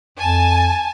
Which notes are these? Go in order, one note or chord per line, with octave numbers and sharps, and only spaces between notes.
F2 G#5 A5